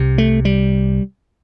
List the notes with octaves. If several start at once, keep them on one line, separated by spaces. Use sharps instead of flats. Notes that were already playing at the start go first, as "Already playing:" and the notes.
Already playing: C2 C3
A3
G3